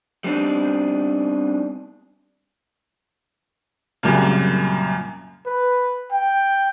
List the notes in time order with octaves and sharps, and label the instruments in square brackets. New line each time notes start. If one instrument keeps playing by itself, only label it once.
[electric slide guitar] G3 B3 C4 D4 D#4
[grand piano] C2 F#2 A#2 C#3
[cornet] B4
G5